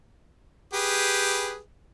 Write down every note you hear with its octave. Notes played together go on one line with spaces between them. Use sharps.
G4 G#4 B4